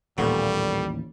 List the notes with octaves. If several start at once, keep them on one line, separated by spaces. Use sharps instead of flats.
A1 D#2 A#2 G3 A3 B3